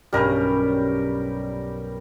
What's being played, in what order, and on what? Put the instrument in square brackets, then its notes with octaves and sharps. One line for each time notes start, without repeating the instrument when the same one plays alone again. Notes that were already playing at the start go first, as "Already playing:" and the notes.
[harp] B1 G2 C#4 [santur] G3 A#4